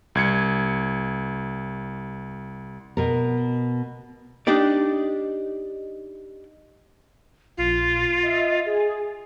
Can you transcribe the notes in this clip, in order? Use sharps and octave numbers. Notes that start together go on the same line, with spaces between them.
C2 G#6 C#7
B2 A#4
D4 D#4 G4 D5
A#1 F4
D#5 E5
G#4